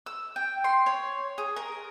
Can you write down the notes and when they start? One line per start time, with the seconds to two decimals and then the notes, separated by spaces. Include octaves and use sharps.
0.06 E6
0.36 G5
0.64 C6
0.86 C#5
1.38 G#4
1.56 A#4